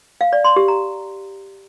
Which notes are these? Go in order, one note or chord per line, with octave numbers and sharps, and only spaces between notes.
F5
D5
C6
G4
A#5